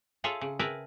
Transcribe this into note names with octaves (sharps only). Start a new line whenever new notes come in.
F4 G#4 A4 C#5 E5
C#3
G#4 A#4 B4 E5 G5 A5